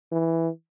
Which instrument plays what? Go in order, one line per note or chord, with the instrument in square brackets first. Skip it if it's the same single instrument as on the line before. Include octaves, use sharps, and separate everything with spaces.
[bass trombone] E3